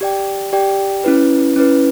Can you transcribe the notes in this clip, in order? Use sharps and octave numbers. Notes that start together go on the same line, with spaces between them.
G4 D5 G5
G4 D5 G5
C#4 E4 B4
C#4 E4 B4